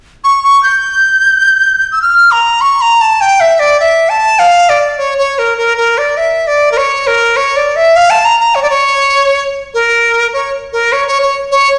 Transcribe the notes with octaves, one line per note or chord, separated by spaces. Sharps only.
C#6
C#6
G6
E6
F6
A#5
C#6
A#5
A5
G5
E5
D5
E5
A5
F5
D5
C#5
C#5
A#4
A#4
A#4
D5
E5
D5
A#4
C#5
A#4
C#5
D5
E5
F5
A5
A#5
A#5
C#5
D5
C#5
A#4
C#5
A#4
C#5
C#5
C#5
C#5